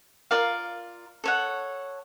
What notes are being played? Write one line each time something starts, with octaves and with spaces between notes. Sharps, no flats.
F4 A#4 D5 F5
A4 C#5 F#5